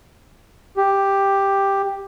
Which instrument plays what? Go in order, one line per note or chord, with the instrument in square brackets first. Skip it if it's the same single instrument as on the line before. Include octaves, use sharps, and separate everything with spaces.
[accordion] G4